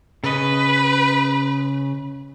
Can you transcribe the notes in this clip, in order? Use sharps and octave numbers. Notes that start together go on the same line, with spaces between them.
C#3 B4 D#5